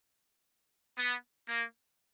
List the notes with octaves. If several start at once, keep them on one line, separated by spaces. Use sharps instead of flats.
B3
A#3